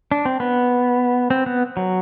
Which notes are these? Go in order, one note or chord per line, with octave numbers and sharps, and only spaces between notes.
D4
C4
B3
C4
B3
F#3